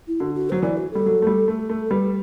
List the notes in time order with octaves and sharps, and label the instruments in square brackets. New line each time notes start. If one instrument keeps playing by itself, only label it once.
[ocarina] E4
[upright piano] D3 [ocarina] F#4
[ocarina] F#4
[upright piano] F#3 [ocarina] C5
[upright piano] E3 [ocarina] D5
[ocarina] F#4
[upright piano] G3 [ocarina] A4
[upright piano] F#3
A3
G3
A3
A3
[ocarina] A4
[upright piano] G3 [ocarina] B4